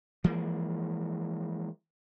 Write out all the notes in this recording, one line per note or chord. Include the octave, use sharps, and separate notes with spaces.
E3 F3 G#3 A#3